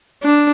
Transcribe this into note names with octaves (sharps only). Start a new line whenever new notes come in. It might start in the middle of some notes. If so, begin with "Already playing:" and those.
D4